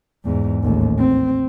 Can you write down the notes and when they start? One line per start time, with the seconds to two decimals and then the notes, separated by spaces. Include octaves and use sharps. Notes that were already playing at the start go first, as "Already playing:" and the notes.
0.24 E2 G#2
0.63 A1 D#2
0.98 C4